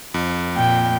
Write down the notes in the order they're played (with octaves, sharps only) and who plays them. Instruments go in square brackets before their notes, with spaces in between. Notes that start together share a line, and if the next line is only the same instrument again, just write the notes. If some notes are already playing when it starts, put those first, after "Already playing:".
[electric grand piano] F2
[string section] A#2 [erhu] G5